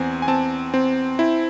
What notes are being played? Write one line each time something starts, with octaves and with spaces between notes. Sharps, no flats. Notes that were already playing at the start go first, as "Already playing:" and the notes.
Already playing: E2 C4 G#5
G#5
C4 A5
C4
E4